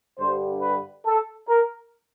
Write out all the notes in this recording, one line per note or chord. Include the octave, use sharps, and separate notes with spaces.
G2 D3 G3 C5
B4
A4
A#4